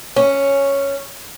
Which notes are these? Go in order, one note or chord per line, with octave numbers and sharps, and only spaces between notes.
C#4